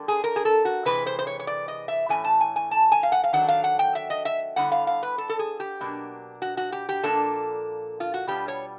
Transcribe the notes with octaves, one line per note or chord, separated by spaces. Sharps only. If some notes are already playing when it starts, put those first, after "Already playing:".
Already playing: D3 G3 A#3
G#4
A#4
G#4
A4
F#4
C3 E3 G#3 B4
C5
C5
C#5
C#5
D5
D#5
E5
A2 E3 A3 C#4 G#5
A5
G#5
G#5
A5
G#5
F5
F#5
F5
D#3 F#3 A3 D4 F#5
F5
F#5
G5
E5
D#5
E5
D3 G3 B3 E4 F#5
F5
F5
B4
A4
A4
G#4
G4
B2 F#3 A#3 D4
F#4
F#4
G4
G4
A#2 F3 A#3 D4 A4
F4
F#4
B2 G3 B3 D4 F4 G4
C#5